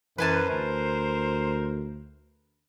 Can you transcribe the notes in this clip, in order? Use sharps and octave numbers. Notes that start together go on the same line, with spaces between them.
F#2 E3 B4 C5 G#5 A5
D2 A#4